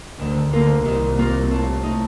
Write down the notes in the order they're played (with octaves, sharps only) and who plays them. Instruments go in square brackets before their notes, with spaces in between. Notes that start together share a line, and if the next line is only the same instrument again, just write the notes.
[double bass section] D2 D3 [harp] D#3
[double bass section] D2 D3 [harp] A#3 F4 A#4
[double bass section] C2 C3 [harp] D#3
[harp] A#3 F4 A#4
A2
A3 D#4